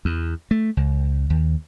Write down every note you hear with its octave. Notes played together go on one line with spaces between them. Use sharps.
E2
A3
C#2
D#2